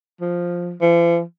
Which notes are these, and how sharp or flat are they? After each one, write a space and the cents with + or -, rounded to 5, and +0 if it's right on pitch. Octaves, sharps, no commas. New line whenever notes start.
F3 +5
F3 -45